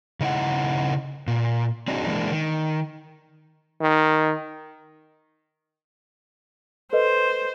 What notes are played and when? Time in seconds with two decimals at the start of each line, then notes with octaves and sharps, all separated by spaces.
0.20 C#3 D#4 E4 F#5
1.28 A#2
1.88 C4 D4 D#4 F#4 G#4
2.06 E3 G#3 A#3 D4
2.31 D#3
3.81 D#3
6.93 A4 B4 C5 D#5